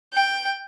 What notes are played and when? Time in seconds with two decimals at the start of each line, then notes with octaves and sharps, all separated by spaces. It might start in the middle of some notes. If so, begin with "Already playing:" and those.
0.14 G5